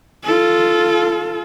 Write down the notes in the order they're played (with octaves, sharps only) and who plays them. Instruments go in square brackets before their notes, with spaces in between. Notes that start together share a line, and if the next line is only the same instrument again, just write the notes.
[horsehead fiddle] F4 A4